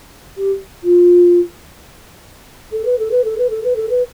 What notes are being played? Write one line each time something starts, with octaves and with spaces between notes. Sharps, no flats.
G4
F4
A4
B4
A4
B4
A4
B4
A4
B4
A4
B4